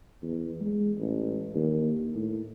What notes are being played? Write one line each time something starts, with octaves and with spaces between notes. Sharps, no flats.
E2
G#3
A1
D#2
A2